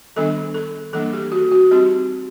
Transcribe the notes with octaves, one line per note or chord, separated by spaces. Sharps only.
D#3 G3 B3 D4 A4
A4
E3 G3 A#3 D4 A4
G4
F#4
F#4
G3 C4 D#4 G4